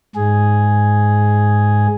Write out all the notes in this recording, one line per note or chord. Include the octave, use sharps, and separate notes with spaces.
G#2 G#4